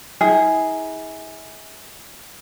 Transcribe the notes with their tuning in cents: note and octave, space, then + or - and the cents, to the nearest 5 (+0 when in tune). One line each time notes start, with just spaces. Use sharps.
E4 -40 G#4 +0